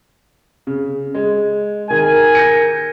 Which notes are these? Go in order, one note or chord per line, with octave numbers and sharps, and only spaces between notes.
C#3
G#3
D#3 G#4 A#4 G#5
G6 A#6 C#7